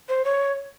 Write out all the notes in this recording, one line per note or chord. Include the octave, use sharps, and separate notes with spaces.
C5
C#5